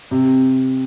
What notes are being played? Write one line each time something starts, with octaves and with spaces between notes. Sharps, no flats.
C3